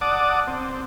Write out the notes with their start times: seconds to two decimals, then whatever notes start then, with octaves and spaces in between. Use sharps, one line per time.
0.01 D5 F#5 A5 D6 D#6
0.47 C4